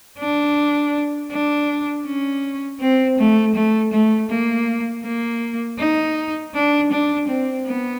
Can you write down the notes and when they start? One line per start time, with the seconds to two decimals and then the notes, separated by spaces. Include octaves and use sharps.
0.19 D4
1.31 D4
2.06 C#4
2.80 C4
3.18 A3
3.55 A3
3.92 A3
4.30 A#3
5.04 A#3
5.78 D#4
6.54 D4
6.91 D4
7.28 C4
7.66 B3